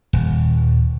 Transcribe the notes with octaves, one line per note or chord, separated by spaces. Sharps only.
D#1